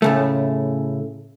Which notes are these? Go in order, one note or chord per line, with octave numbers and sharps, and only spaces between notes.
A2 C#3 A3